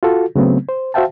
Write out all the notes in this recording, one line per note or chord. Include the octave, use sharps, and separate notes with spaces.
F4 F#4 A4
C#3 F#3 A3 B3 C4
C5
F#4 C5 E5 F5 G5 A5